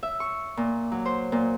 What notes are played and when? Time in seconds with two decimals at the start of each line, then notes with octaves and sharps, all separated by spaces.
0.03 E5
0.20 C#6
0.57 A#2
0.92 F#3
1.05 C5
1.32 A#2